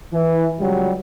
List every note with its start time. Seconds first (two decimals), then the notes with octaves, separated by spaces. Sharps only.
0.13 E3
0.60 C#2 F#3 G3